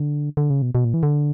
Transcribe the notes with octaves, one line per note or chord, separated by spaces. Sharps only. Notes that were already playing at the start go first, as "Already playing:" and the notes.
Already playing: D3
D3
C#3
B2
B2
A#2
E3
D3